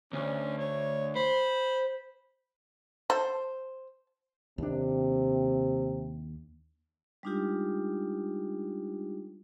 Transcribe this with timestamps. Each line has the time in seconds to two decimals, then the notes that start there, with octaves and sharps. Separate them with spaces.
0.13 D2 C#4
0.58 C#5
1.16 C5 B5
3.10 A4 C5
4.58 D#2 C3 D4
7.23 G3 G#3 D4 D#4 F4 G4